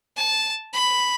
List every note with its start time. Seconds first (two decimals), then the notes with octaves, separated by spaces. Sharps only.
0.17 A5
0.73 B5